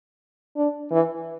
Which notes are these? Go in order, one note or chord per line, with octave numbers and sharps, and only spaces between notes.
D4
E3